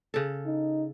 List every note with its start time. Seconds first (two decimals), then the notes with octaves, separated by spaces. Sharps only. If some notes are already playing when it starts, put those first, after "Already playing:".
0.14 C#3 A4
0.46 D#4